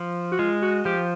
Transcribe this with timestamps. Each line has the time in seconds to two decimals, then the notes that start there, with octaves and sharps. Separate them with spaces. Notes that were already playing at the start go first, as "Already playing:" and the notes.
Already playing: F3
0.32 F#4
0.39 G#3 F4
0.62 F#4
0.85 F3 G4